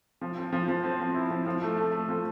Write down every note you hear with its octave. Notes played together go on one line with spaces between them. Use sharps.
F3
C4
F3
F3
C4
F3
E4
F3
F3
A3
A3
A3
F3